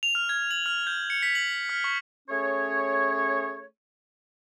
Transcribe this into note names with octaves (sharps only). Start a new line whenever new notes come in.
F7
F6
G#6
F#7
F6
G6
C#7
B6
F#7
F6
C#6
A3 C#4 G#4 C#5